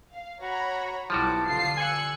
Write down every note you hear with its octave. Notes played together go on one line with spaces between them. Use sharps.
F5
F#4 C#5 A#5 B5
B1 F3 G3 E4 F#4 A5 D6
D3 F4 C7
G#5 E6 F#6 C#7